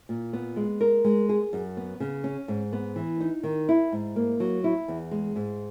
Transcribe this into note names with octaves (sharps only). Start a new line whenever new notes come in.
A#2
B3
G#3
A#4
G#3
G#4
F#2
B3
C#3
C#4
G#2
B3
E3
D#4
D#3
E4
G#2
A#3
F#3
E4
E2
G#3
G#2